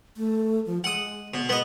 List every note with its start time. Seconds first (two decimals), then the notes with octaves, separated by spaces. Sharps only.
0.17 A3
0.66 F3
0.84 G#3 F#5 D#6
1.34 B2
1.49 G#3 B3 D#5